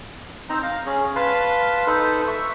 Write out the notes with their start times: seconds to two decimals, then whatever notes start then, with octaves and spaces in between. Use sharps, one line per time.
0.50 C4 D#4 C5 A#5
0.63 F5 A#5
0.86 C#4 G#4
1.16 B4 F5 A5 C6
1.87 D#4 A4 B4 C5
2.28 E5 C#6